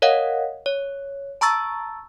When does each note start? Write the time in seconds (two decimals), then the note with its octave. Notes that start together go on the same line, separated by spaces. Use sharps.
0.02 A#4 C#5 D#5 F5 F#5
0.66 C#5
1.41 A5 A#5 C#6 E6 A6